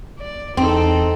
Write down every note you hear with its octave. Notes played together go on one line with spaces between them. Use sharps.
D5
E2 C4 D#4 A4